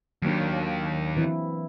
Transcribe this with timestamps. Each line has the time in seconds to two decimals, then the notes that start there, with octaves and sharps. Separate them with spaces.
0.22 D#2 D#3 F#3 A#3 D4
1.17 E3 C4 E4